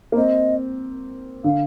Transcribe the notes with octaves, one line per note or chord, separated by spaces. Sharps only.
A#3
C4 D#5
D3 F5